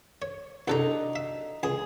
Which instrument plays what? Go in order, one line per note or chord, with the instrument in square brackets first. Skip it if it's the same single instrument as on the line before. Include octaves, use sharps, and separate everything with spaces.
[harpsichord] C#5
[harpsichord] C2 A4 A#5 [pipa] F#3 D4 D#4
[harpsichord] E5
[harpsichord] C#2 [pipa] G#4